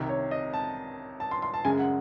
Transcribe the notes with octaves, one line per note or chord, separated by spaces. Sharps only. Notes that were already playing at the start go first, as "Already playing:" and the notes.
Already playing: C2 C3 D#3
C#5
D#5
A5
A5
C6
C6
A5
F#2 C#3 G#3 G#5
F#5